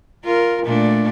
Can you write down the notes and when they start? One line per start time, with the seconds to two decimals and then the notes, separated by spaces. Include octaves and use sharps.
0.24 F4 A#4
0.64 A#2 A3 D4